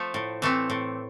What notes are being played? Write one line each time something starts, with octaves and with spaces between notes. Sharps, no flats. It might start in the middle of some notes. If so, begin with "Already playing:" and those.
Already playing: F3 A3
A2
E3 A3 C4
A2